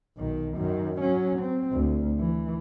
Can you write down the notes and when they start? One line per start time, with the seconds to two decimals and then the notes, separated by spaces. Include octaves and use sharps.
0.17 B1 D#3
0.55 F#2 D#3
1.01 F#3 C#4
1.40 C4
1.72 D2
2.19 E3